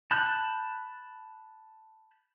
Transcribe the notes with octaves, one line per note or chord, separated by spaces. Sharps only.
A5 B5 F#6 G6